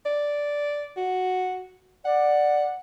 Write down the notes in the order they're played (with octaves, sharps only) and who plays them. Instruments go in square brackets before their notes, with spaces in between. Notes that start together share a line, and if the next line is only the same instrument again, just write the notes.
[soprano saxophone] D5
F#4
[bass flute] D5 [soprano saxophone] F#5